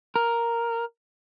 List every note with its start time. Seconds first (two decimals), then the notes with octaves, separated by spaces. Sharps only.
0.16 A#4